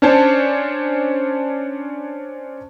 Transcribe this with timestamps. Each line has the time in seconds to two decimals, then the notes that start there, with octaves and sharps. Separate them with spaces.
0.02 C#4 D4 C5 C#5 A5